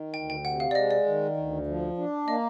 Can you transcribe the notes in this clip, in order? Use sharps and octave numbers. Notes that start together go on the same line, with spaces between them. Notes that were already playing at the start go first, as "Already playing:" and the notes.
Already playing: D#3
D2 G5
G5
C3 F#5
F5
D5
G#3 D#5
D5
D#3
D2
F3
D4
A#3 D#5